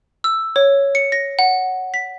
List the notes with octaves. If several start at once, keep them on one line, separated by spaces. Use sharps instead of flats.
E6
C#5
C#7
A#6
F#5
B6